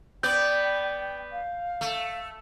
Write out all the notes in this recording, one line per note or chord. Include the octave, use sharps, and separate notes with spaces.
B3 D5 G5 G6
F5
A3